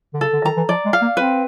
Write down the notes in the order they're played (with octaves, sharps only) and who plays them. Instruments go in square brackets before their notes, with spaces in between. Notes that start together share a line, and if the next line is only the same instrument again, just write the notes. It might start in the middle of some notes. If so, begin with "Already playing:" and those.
[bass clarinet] D3
[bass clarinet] C#3 [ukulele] A4
[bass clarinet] D3
[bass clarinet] D#3 [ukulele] A#5
[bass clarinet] E3
[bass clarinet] F3 [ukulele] D5
[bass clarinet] G#3
[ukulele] F5
[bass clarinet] A#3
[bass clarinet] C4 [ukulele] B4